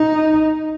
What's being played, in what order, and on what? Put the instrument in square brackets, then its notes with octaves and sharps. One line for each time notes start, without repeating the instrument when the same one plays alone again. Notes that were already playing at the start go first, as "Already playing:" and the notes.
Already playing: [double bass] D#4